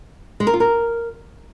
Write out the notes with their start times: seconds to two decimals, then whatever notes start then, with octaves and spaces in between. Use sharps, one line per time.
0.40 G#3
0.47 A#4
0.53 F4
0.60 A#4